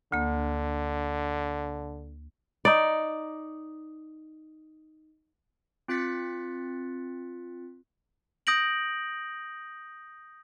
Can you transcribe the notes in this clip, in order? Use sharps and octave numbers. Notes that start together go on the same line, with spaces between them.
D2 D3 A#3
D#4 D5
C4 F4 F#6 A6 B6 C#7
D#6 G6 A#6 D7 F#7